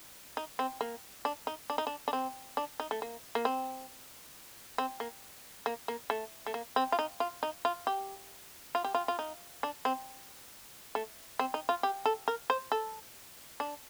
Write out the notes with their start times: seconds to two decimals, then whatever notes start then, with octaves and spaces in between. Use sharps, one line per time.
0.37 D#4
0.59 C4
0.81 A#3
1.25 D4
1.47 D#4
1.70 D4
1.78 D#4
1.87 D4
2.08 D4
2.13 C4
2.57 D4
2.80 D#4
2.91 A3
3.02 A#3
3.35 A#3
3.45 C4
4.78 C4
5.00 A#3
5.66 A#3
5.88 A#3
6.10 A3
6.46 A3
6.54 A#3
6.76 C4
6.92 F4
6.99 D#4
7.20 F4
7.43 D#4
7.65 F4
7.87 G4
8.75 F4
8.84 G4
8.95 F4
9.08 F4
9.19 D#4
9.63 D4
9.85 C4
10.95 A3
11.39 C4
11.54 D#4
11.69 F4
11.83 G4
12.06 A4
12.28 A#4
12.50 C5
12.72 A4
13.60 D4